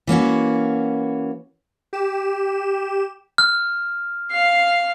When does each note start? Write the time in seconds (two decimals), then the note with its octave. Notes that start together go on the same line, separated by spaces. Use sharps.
0.07 E3 A#3 C#4 F#4
1.93 G4 E7
3.38 F6
4.31 F5 C7